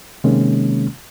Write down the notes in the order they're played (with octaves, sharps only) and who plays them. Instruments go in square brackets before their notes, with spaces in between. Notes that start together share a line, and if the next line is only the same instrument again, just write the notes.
[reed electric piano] C3 D#3 G#3 A#3 C#4